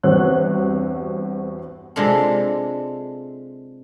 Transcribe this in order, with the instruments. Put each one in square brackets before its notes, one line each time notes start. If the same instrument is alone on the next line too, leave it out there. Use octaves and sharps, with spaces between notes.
[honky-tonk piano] E2 G2 C4 F#4 C#5 F#6
[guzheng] C3 G#3 D4 F4 A4